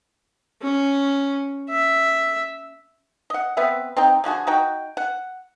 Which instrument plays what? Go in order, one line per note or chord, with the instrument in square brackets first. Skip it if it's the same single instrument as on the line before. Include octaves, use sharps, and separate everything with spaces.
[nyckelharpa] C#4
E5
[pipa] D#5 F#5
B3 C4 B4 E5
C4 D#4 G5
D3 F3 F#4 G#4
D#4 F#4 G5
F#5